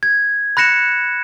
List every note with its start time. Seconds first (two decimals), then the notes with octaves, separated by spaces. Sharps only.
0.03 G#6
0.57 B5 F#6 A#6 C#7 E7